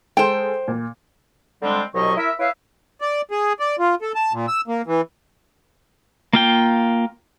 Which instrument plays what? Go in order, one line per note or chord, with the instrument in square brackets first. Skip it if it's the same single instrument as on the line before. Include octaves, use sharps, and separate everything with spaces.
[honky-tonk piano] G#3 A4 [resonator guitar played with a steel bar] C5 G5
[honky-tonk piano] A#2
[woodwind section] D3 G3 G#3 C4 D4
C2 B2 F#3 D#5 C#6
E4 A#4 E5
E4 B4 C#5 E5 F5
[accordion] D5
G#4
D5
F4
A4
A5
A#2
E6
A#3
E3
[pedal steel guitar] A#3 F4 G5